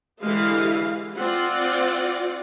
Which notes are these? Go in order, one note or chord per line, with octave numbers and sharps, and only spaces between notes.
D3 E3 G#3 G4 B4 F5
C4 F4 D5 F#5